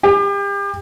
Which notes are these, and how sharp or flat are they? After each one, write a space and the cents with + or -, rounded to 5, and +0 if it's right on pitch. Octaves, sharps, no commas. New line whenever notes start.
G4 +35